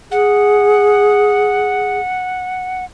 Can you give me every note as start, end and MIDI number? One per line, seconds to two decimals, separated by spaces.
0.12 1.99 68
0.12 2.85 78